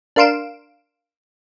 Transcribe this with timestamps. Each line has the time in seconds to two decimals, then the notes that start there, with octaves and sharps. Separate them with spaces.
0.16 D4 A#4 F5 C6 D7 E7